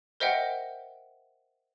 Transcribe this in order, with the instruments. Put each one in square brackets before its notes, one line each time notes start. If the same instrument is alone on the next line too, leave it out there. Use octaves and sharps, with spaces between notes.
[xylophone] A#4 C5 D#5 E5 F#5 G5